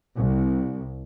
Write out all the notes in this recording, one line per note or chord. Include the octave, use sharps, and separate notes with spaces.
C2